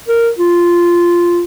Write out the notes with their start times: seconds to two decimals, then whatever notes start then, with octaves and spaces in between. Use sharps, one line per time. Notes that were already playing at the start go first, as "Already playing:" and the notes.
0.08 A#4
0.38 F4